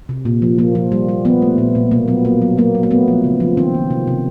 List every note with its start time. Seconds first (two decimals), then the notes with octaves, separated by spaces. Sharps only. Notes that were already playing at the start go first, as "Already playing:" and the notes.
0.09 C3
0.25 A#2
0.42 F3
0.58 F3 A#3
0.75 F3
0.92 G3
1.09 G3
1.25 F3 B3
1.42 A3
1.58 A#2
1.75 A#2
1.91 B2 A#3
2.08 F#3 B3
2.25 A#3
2.42 F#3
2.57 F#3 A#3
2.75 F#3
2.83 A#3
2.91 A3 B3
3.08 F3
3.24 C#3
3.40 F3
3.57 D#3 C4
3.74 D#3
3.90 C3
4.07 C3